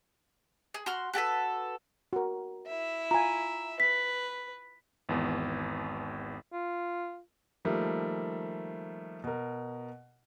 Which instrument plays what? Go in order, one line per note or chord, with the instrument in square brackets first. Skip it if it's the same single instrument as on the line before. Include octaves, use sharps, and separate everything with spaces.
[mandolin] G#4
F#4 C6 F6
F#4 G4 A4 B4
[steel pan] F#4 A#4
[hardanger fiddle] E4 E5
[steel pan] F4 G#5 [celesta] A#5
[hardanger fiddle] B4 [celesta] B6
[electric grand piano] G#1 E2 B3
[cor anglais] F4
[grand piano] D#3 F3 G3 A3 A#3
B2 A#4